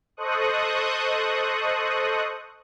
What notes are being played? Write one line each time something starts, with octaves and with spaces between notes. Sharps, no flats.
A4 C5 D#5 C#6 D#6 F#6